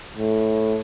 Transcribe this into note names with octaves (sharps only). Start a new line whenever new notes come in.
A2